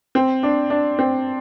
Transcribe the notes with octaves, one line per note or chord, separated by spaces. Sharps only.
C4
D4
D4
C4